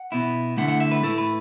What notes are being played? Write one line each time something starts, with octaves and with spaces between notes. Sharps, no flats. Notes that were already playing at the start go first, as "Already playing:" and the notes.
Already playing: F#5
B2 B3 E4
D3 A3 E4 F#5
F#5
E5
B4
A2 A3 E4 A4
B4